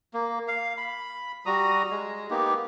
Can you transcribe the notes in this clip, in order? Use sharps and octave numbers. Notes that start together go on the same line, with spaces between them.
A#3
F5
B5
G3 F#4 A#5 D#6
G#3
A#3 B3 D#4 G4